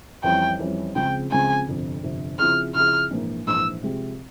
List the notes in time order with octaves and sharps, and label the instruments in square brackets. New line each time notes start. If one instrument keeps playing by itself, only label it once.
[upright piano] F2 E3 G3 C#4 [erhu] G5
[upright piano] F2 E3 G3 C#4
[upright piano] C#2 C#3 F3 G#3 C4 [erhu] G5
[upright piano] C#2 C#3 F3 G#3 C4 [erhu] G#5
[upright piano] G1 F2 C3
G1 F2 C3
[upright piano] C#3 F3 C4 E4 G#4 [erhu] F6
[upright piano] C#3 F3 C4 E4 G#4 [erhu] F6
[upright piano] A#1 G#2 E3 A#3
[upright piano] A#1 G#2 E3 A#3 [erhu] E6
[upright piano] C3 F3 G#3 C4 G4